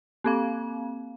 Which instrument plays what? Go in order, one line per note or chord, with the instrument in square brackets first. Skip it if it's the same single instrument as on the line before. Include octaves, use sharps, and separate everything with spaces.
[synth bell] A#3 C4 F5